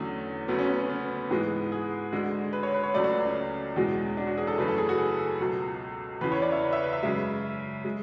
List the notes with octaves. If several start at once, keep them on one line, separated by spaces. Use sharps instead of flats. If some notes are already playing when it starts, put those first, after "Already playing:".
Already playing: E2 D3 F#3 A3 C#4
D2 C#3 F#3 A3 B3
C#4
B3
C#4
B3
G#2 E3 G#3
G#4
D2 D3 G#3
B4
C#5
B4
C#5
C#2 C#3 F#3 A3 D5
F#4
C#4
E2 B2 G#3
D4
F#4
G#4
A4
F#2 C#3 E3 A3 B4
A4
G#4
F#4
G#4
A4
C#2 B2 F#3
E2 C#3 E3 B4
C#5
D5
E5
E5
B4
E5
F#2 C#3 G#3 E5
G#3